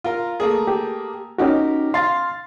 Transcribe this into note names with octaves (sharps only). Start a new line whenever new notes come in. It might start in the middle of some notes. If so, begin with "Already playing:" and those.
F4 A#4
A3 A#3 G#4
G4
C#4 D#4 F#4 G4 A#4
F5 C6 A6